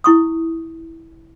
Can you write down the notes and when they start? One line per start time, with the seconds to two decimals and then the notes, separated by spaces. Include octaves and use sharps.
0.04 E4 C#6 D#6